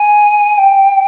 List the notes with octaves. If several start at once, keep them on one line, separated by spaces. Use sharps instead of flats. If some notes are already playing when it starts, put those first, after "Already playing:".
Already playing: G#5
G5